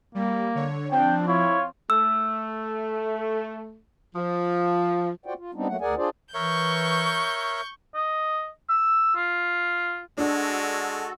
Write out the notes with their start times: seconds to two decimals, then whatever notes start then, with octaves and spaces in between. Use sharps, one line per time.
0.15 G3 A#3
0.55 D3 C#5
0.91 F3 C4 D4 G5
1.28 E4 F4 C#5
1.90 A3 E6
4.16 F3
5.26 F4 F#4 C5 D5 F#5 G5
5.38 F4
5.55 G3 B3 C4 D4 D#4
5.68 F#3 A3 A#3 F#5
5.81 D2 G#4 A#4 D5 F#5 G#5
5.97 D4 F4 G#4 C5 D5
6.34 E3 A#4 C#5 E5 C#6 G6
7.95 D#5
8.70 E6
9.16 F4
10.18 G#3 D4 F#4 A4